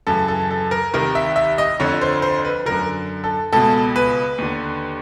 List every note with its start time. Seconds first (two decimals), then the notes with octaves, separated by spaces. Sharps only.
0.07 F#2 C#3 E3 A4
0.28 A4
0.51 A4
0.71 A#4
0.94 C2 C3 D#3 A#4
1.15 E5
1.36 E5
1.58 D#5
1.80 F2 D3 C#5
2.01 C5
2.22 C5
2.45 B4
2.65 F#2 D3 A#4
3.24 A4
3.53 C#2 B2 A4
3.96 B4
4.38 D#2 D3